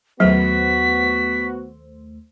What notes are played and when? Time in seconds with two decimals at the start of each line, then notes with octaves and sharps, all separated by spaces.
0.20 D#2 F#3 A3 B3 F#4 C5 B6